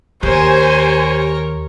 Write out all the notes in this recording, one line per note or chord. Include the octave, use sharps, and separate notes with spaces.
D#2 G4 A#4 C5 C#5 G#5